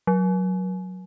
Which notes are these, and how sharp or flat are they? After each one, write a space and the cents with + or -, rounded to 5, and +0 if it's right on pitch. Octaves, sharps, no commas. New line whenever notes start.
F#3 -5